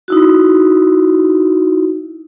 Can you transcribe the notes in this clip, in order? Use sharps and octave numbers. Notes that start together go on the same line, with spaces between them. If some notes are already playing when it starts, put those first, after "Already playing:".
D#4 E4 F#4